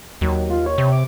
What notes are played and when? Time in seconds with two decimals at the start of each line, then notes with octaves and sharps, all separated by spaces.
0.21 D#2 F#3
0.50 F4
0.66 C#5
0.78 C3
0.92 D6